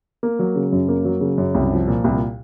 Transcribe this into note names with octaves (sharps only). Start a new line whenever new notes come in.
A#3
F#3
C#3
F#2
A#3
F#3
C#3
F#2
C2
F3
A#2
C2